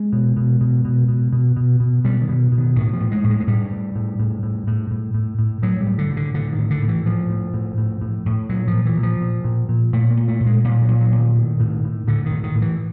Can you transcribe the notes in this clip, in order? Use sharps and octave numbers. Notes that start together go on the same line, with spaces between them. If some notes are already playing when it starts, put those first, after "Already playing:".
Already playing: G#3
B2
B2
B2
B2
B2
B2
B2
B2
B2 G3
D#3
B2
B2
D#3
A2 D#3
F3
A2
G#3
A2
G#3
G#3
A2 G3
A2
A2
A2
A2
A2
A2
A2
A2
A2 F#3
G3
A2
D3
A2
D3
A2 D3
D#3
A2
D3
A2
E3
A2 F3
A2
A2
A2
A2
A2
A#2 F#3
F3
A#2
E3
A#2
F3
A#2
A#2
A#2
A#2 A3
A#3
A#2
A3
A#2
G#3
A#2 G3
F#3
A#2
F#3
A#2
D#3
A2 D#3
A2
A2
A2 D3
D#3
A2
D#3
A2
E3